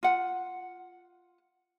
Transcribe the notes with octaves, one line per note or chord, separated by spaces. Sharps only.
F4 F#5